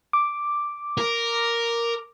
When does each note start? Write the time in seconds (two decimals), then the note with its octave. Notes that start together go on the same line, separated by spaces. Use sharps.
0.13 D6
0.98 A#4